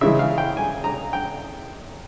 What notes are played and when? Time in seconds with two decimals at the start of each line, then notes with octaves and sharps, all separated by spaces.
0.01 C#3 E3 G#3 E5
0.19 F5
0.38 G5
0.57 G#5
0.84 A#5
1.13 G5